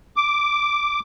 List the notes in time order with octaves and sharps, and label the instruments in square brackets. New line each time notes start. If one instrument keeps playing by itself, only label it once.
[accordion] D6